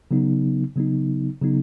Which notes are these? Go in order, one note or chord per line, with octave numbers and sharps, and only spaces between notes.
C#3 F#3 B3 D#4
C#3 F#3 B3 D#4
C#3 F#3 B3 D#4